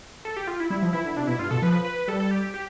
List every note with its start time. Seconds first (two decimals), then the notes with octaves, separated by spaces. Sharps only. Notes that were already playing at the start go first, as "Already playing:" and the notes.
0.25 A4
0.36 G4
0.47 F4
0.60 E4
0.70 G3 E4
0.82 F3
0.93 E3 E4
1.05 D3
1.16 C3 D4
1.27 B2 E4
1.39 G2 F4
1.51 B2 A4
1.62 F3 B4
1.85 B4
2.08 G3 A4
2.20 A4
2.31 G4
2.54 G4